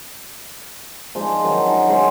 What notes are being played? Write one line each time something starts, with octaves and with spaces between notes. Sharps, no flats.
F3 G#3 D4 D#4
D#3 F#3 D#4
D#4 A5
G#3 C5 C#5 F5